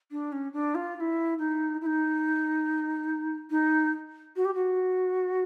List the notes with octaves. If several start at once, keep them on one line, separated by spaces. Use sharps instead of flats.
D4
C#4
D4
F4
F4
E4
D#4
E4
D#4
D#4
F#4
G4
F#4